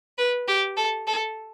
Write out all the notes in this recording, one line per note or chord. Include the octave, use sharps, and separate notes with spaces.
B4
G4
A4
A4